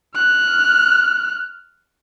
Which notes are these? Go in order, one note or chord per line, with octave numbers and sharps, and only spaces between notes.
F6 F#6